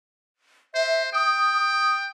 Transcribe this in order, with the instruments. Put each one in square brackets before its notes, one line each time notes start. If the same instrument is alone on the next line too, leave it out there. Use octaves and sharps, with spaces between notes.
[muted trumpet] C5 [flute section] E5
[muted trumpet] G5 [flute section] D#6